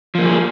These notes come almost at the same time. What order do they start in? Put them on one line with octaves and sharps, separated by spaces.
F3 A#3 G3 G#4